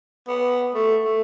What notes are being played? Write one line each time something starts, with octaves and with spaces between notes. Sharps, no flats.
B3
A3
A3